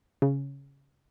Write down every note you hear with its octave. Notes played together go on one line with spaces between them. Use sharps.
C#3